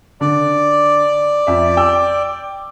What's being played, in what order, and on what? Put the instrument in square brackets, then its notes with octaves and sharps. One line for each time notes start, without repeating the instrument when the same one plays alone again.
[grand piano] D3 [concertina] D5
[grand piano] F2 E5
G5 D6 E6